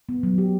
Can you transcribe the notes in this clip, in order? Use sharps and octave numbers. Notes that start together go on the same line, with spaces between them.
B3
F#3
G4